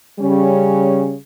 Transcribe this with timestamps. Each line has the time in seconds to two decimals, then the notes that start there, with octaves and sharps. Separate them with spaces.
0.20 C#3 G3 C#4